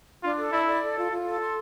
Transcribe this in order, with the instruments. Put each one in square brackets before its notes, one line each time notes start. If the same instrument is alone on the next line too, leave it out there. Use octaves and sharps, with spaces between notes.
[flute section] D4 [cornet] F4
[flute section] A4
[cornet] E4 [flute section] D5
[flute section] D5
A4
F4
F4
A4
C6